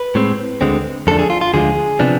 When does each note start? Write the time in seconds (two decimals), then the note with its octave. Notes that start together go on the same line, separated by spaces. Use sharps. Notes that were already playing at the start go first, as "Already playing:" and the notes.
Already playing: B4
0.15 A2 G#3 C4
0.61 D2 D3 G#3 C4
1.07 F2 D3 A3 D4 A4
1.19 G#4
1.30 F4
1.41 F4
1.53 D2 D3 F3 G#3 G#4
1.99 C3 F3 B3 D4